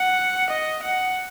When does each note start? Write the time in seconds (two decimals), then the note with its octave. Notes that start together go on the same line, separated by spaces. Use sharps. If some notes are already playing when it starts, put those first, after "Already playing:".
Already playing: F#5
0.50 D#5
0.83 F#5